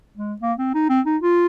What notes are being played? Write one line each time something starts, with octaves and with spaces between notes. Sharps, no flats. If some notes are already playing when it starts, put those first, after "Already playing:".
G#3
A#3
C4
D#4
C4
D#4
F4